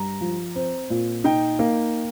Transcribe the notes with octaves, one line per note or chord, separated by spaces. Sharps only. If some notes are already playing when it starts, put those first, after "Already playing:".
Already playing: G2 A#5
F3
C4
A#2
D#4 G5
A#3